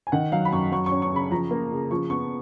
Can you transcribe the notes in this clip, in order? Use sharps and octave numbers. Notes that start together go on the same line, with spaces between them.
G#5
D#3 F#5
F#3 F5
B5
F#2 C#6
F#3 C#6
C#6
C#4
C#6
C#3 B5
F3 A#5
A#3
C#3
F3 C#6
B3 C#6